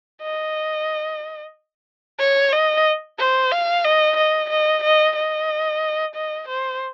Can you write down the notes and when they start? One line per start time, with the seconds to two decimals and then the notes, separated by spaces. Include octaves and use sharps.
0.22 D#5
2.19 C#5
2.52 D#5
3.19 C5
3.52 F5
3.85 D#5
4.17 D#5
4.50 D#5
4.83 D#5
5.16 D#5
6.15 D#5
6.48 C5